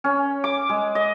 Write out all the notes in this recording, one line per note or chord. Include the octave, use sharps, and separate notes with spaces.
C#4
D6
G#3
D#5